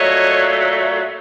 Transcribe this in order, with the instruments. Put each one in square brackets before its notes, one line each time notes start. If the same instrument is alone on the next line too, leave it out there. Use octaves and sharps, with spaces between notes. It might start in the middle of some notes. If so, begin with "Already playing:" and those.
Already playing: [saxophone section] A#2 F#3 A3 C#5 D#5